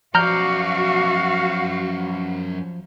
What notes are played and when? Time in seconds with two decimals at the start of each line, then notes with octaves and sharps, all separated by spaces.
0.15 F#2 F3 F#4 D5 F5 A#5 F6 G6